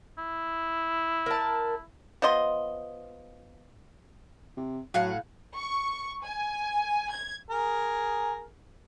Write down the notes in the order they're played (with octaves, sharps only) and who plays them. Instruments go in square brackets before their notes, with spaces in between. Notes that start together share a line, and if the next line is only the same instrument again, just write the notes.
[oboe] E4
[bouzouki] A#4 A5
[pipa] F3 B3 D#5 C6
[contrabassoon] C3
[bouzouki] A2 F5 F#5 [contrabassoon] F#3
[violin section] C#6
G#5
G#6
[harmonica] G#4 A#4